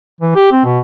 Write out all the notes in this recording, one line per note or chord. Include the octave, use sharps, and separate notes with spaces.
E3
G4
C4
B2